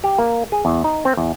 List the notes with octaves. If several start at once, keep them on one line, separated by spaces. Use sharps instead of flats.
G4
A#3
G#4
E2
D#4
C4
E2